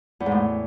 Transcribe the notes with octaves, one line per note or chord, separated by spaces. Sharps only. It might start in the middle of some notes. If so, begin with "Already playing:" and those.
E2
G#2
A2